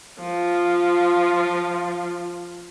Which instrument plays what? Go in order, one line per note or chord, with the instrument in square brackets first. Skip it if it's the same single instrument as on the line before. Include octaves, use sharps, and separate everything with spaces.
[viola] F3 F4